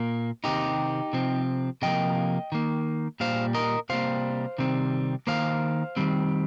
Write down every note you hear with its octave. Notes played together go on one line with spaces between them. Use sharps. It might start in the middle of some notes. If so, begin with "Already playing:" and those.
Already playing: A#2 A#3
C3 D#3 C4 D#4 G4
C3 F3 C4
C3 F3 A#3 D#5 G5
D#3 A#3
A#2 G3 A#3 C5 F5
A#4 D#5
C3 G3 A#3 C5 F5
C3 D#3 G3 C4
D#3 A#3 C5 F5
D#3 G3 C4